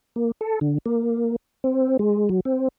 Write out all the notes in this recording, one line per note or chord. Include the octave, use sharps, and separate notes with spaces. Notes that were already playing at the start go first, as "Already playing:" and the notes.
A#3
A4
D3
A#3
C4
G#3
F#3
C4